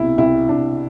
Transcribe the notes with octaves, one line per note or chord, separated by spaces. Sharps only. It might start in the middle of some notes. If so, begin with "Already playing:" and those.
Already playing: C2 B2 E4
C2 E4
C2 D4